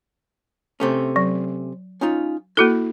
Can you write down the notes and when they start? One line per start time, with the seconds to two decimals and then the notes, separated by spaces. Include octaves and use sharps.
0.80 C3 A3 C#4
1.16 F#3
2.01 C#4 D#4 F4
2.57 A#3 E4 F#4 A4